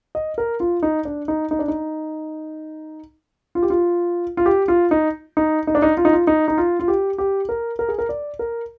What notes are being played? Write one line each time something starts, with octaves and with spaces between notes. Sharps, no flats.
D#5
A#4
F4
D#4
D4
D#4
D#4
D4
D#4
F4
G4
F4
F4
G4
F4
D#4
D#4
D#4
D4
D#4
F4
D#4
F4
D#4
D#4
F4
F4
G4
G4
A#4
A#4
G#4
A#4
D5
A#4